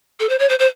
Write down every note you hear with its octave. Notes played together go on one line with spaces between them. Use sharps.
A4
C5
C#5
C5
C5